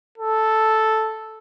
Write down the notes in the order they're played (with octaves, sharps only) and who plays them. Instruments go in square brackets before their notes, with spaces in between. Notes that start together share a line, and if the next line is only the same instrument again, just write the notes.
[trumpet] A4